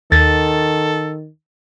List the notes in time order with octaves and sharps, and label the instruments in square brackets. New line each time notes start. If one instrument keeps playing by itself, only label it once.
[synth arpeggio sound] D#2 [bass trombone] D#3 [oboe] A4 [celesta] A6